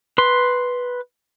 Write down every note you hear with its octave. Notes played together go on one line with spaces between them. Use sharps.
B4 C6